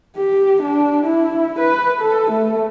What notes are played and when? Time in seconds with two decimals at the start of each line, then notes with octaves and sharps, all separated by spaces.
0.16 G4
0.62 D4
1.06 E4
1.59 B4
2.01 A4
2.30 A3